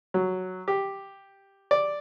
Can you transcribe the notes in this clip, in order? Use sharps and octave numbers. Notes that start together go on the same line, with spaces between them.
F#3
G4
D5